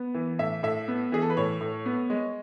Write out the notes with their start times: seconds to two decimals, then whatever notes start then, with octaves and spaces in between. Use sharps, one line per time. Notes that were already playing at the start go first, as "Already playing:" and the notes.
Already playing: B3
0.14 E3
0.39 A2 E5
0.63 A2 E5
0.88 B3
1.12 E3 G#4
1.22 A4
1.30 B4
1.37 A2 C#5
1.61 A2
1.86 B3
2.10 G#3